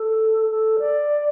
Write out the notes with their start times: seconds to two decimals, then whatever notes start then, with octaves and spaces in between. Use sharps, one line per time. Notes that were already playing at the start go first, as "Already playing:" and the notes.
Already playing: A4
0.50 A4
0.79 D5